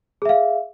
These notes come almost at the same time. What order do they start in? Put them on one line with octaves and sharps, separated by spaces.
G#4 E5 F5